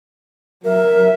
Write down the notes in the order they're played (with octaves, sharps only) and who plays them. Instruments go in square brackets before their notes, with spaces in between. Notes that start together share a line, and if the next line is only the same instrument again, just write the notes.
[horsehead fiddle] F#3 E5 [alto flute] A#4